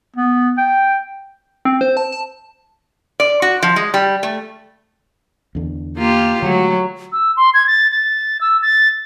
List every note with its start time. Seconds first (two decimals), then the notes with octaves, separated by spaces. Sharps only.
0.17 B3
0.58 G5
1.65 C4
1.81 C5
1.97 A5
2.12 A5
3.20 D5
3.42 F#4
3.63 F3
3.76 G#3
3.94 G3
4.23 A3
5.55 E2 D3
5.97 A#3 F4 G4
6.42 D3 F#3 G#3 A3
7.12 E6
7.37 C6
7.54 G#6
7.67 A6
7.91 A6
8.41 E6
8.62 A6